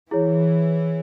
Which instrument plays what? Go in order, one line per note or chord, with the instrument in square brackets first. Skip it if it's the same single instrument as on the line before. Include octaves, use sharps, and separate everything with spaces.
[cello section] E3 [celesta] E4 G#4 C#5